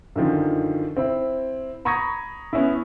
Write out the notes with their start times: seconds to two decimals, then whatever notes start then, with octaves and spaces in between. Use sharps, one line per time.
0.15 F#2 D3 D#3 F3
0.97 C4 E4
1.85 A#5 B5 C#6 D#6 G#6 A#6
2.53 B3 C#4 E4